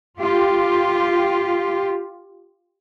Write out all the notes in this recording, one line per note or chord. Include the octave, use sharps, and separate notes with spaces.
F4 G4